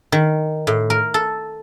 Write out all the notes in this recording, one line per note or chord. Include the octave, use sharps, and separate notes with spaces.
D#3
A2
A#4
A4